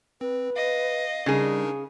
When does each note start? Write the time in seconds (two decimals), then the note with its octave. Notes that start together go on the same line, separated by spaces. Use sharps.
0.21 C4 B4
0.56 D#5 F5
1.26 C#3 G3 D4 D#4 G#4 A#4